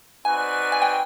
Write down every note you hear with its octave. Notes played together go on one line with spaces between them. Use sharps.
C4 D#4 F#4 B4 D5 G#5
G#5
G5